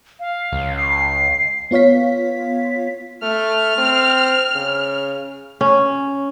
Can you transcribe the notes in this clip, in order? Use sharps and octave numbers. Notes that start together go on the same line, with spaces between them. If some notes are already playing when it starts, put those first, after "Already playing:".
F5
C#2
C7
B3 F4 C#5 F5 B6
A3 F6
C4
C#3
C#4